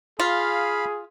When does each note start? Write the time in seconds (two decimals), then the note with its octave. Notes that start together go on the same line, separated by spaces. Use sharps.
0.20 F4 G#4 F5 B5